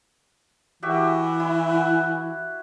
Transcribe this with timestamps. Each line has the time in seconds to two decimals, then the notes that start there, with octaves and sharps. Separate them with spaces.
0.83 E3 F#4 G4 E5
1.40 E4
1.69 F#5